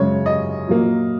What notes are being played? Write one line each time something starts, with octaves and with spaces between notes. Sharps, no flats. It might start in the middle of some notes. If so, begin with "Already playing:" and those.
Already playing: F#2 C#3 G#3 C#5
D#5
A#2 F#3 A#3